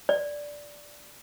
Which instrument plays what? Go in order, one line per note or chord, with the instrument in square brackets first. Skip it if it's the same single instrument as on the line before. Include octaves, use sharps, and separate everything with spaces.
[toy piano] D5